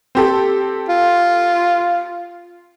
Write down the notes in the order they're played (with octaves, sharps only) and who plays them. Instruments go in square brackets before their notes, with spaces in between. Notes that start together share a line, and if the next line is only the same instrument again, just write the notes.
[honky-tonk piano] C4 G4 A4
[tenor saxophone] F4